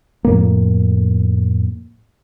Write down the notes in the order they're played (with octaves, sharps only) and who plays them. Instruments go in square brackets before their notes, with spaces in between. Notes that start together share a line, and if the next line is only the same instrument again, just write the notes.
[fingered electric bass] F2 A2 A#3